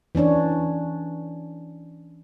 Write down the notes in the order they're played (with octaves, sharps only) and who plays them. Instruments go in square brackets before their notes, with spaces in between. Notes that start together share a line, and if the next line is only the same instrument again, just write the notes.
[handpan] E3 C#4 D4 C#5